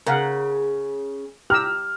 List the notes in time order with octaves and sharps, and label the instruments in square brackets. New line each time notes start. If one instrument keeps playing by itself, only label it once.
[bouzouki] C#3 [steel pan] A#4 F5 F#5
[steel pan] G4 A#5 E6 [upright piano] F6